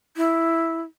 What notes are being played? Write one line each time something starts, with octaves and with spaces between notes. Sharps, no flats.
E4